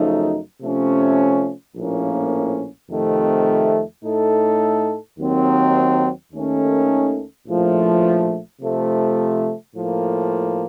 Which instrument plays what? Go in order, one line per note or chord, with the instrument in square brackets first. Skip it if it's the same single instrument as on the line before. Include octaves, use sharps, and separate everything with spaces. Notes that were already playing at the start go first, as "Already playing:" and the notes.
Already playing: [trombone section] F#2 C#3 F3 A3 D#4
C3 F3 A3 C#4
A#1 A2 F3 A#3 C#4
F2 C3 D#3 A3
A2 A3 D#4 A4
D#2 D#3 F#3 C4
D#2 D#3 A3 C#4 A4
A#1 A2 F3 A3
C3 F3 A3
A2 F3 A#3